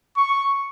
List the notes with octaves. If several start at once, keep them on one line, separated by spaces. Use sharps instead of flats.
C#6